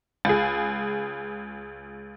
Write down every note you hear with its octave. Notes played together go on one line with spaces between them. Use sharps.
C#2 G#4